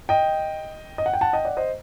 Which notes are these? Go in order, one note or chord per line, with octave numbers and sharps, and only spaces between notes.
D#5 G5
D#5
F#5
G5
F#5 A5
D#5 G5
D5 F#5
C5 D#5